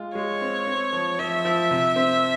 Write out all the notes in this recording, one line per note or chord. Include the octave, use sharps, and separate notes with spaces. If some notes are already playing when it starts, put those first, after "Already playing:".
Already playing: G#3 F4
G#3 C#5
C4
C4
F3
F3 E5
F3
C3
C4